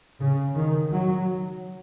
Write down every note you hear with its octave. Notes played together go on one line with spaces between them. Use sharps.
C#3
D#3
F#3